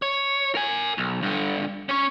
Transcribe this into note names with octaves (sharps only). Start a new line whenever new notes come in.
C#5
A#4 G#5
B1
G2 D3
C#4 C#5